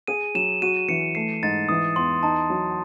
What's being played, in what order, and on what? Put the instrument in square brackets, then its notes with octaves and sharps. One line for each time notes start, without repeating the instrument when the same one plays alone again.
[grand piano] G#4 [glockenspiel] D#7
[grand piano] F#3 [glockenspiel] E7
[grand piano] F#4 [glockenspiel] D#7
[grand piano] E3 [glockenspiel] C#7
[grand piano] A3 [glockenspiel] C7
[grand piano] G#2 [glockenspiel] A6
[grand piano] E3 [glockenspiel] D#6
[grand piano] E2 [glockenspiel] C6
[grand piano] D#4 [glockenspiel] A5
[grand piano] F#3